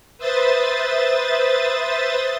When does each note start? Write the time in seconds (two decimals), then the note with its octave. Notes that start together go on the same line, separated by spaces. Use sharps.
0.18 B4 C5 E5 D#6 A6